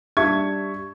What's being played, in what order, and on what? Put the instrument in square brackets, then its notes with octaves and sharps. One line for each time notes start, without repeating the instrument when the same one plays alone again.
[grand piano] G2 G3 E5 C#6 G#6